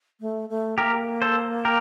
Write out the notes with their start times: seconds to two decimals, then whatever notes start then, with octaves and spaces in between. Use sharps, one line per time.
0.21 A3
0.49 A3
0.78 A#3 G4 A#4
1.22 A4 C5
1.65 G4 A#4